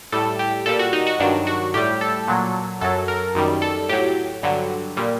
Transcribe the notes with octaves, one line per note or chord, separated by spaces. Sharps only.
A2 G3 A4
G4
A#2 G3 A4
F#4
D#4
F#4
G2 D#3 F#3 D4
F#4
A2 G3 G4
A4
A#2 F#3
F#2 F#3 A4
A#4
F#2 D#3 G3
A4
A2 F#3 G4
G2 D3 F#3
A#2 G3